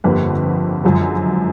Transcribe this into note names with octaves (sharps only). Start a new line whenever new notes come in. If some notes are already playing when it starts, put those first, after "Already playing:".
G1 F2 D3 G3 A#3 B4
F#2 D3 F3 G#3